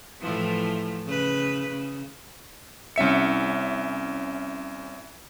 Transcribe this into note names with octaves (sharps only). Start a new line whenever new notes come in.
A2 E3 F3
C#3 B4
C#3
C2 C#4 E5 C#7